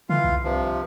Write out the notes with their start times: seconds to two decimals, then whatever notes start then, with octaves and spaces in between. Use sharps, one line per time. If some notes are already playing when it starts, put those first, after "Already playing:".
0.09 D3 E3 F4 F5
0.24 C2
0.44 G2 C3 F3